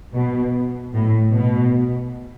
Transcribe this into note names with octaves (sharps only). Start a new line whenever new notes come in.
B2
A2
B2